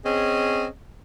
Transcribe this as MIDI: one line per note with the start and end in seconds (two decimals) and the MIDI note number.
0.04 0.66 60
0.04 0.66 61
0.04 0.66 68
0.04 0.66 75